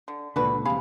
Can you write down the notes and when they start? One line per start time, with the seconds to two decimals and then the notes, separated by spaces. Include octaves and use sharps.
0.08 D3
0.36 C#2 A#2 D3 D4 F#4 B4
0.65 E1 C3 G#4 F5 B5